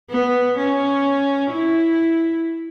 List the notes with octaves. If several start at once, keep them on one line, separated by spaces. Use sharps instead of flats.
B3
C#4
E4